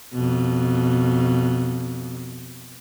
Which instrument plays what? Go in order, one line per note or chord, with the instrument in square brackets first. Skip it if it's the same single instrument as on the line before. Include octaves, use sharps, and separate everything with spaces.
[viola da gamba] F2 B2